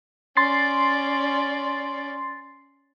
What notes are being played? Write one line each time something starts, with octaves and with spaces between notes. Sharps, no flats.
C#4 D5 C6 A6 C7